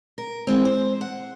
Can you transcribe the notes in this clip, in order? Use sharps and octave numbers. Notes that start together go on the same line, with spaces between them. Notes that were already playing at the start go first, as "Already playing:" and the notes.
A#4
E3 G#3 C4
C5
F#5